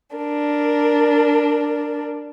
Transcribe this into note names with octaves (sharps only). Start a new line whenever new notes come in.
D4 A#4